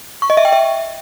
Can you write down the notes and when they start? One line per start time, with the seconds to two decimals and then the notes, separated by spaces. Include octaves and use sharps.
0.22 C#6
0.30 D#5
0.37 E5
0.45 G5
0.53 E5